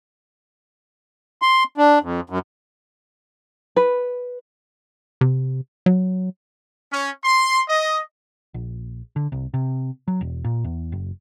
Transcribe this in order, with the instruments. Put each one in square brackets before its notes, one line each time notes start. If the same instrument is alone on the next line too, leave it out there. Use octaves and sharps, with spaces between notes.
[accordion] C6
D4
F2
F#2
[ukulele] B4
[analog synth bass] C3
F#3
[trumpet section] C#4
C6
D#5
[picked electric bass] A#1
D3
C2
C3
F#3
E1
A#2
E2
F#1